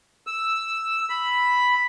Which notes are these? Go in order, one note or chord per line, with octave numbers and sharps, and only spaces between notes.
E6
B5